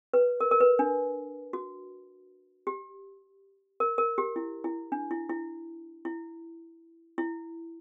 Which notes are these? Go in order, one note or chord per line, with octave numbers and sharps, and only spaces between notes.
B4
A#4
A#4
B4
D4
F#4
G4
A#4
A#4
G4
E4
E4
D4
E4
E4
E4
E4